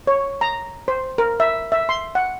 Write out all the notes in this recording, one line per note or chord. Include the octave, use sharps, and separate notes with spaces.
C#5
A#5
C5
A#4
E5
E5
C6
F#5